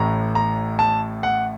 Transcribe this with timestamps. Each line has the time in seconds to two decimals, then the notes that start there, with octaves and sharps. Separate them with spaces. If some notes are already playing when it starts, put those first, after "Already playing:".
Already playing: A1 A2 A3 A#5
0.35 A#5
0.79 A5
1.23 F#5